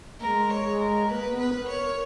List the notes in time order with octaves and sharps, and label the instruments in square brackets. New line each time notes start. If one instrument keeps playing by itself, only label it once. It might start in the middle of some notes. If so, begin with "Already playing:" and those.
[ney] A#3 [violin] A#4
[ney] G#3
[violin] C#5
[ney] G#3
[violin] A#4
[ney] A#3 [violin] B4
[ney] B3
[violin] B4
[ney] A#4
[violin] C#5
[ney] A#4